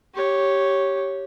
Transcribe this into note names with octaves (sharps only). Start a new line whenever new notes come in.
G4 C#5